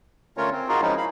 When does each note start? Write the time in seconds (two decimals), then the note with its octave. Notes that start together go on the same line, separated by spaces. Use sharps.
0.37 D3 A3 C#4 F4 A#4 C#5
0.52 C4
0.68 D#4 F4 F#4 G#4 A#4
0.81 F3 G#3 C#4 D#4 E4
0.97 F5 B5